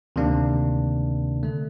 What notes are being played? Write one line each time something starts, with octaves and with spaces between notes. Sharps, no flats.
D2 C3 D#3 A#3 D4
D3 A3